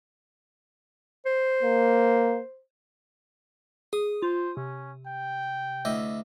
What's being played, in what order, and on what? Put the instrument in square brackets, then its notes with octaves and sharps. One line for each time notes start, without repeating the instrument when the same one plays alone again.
[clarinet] C5
[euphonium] A#3
[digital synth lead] G#4 [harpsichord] D#6
[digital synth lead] F4 [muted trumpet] C5
[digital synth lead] C3 [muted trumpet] C#4
[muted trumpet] G5
[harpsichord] D2 E4 D#5